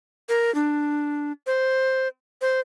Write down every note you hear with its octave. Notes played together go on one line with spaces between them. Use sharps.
A#4
D4
C5
C5